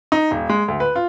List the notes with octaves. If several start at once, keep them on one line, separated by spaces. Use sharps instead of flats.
D#4
D#1
G#3
D2
B4
F4